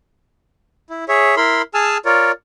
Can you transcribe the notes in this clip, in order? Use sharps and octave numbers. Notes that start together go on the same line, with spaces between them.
E4
G#4 C#5 E5
E4 A#4 B5 C6
G#4 G#5 A5 E6 F6
F4 A#4 C#5 D5